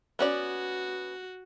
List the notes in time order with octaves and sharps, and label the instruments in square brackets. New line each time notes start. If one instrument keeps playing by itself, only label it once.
[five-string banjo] B3 C#4 D5 [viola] F#4